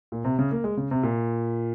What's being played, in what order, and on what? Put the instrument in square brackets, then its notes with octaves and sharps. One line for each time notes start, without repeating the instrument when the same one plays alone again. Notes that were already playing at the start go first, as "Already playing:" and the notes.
[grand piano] A#2
C3
C#3
A#3
G#3
C#3
C3
A#2